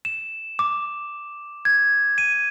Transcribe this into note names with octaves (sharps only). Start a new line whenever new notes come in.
E7
D6
G#6
D#7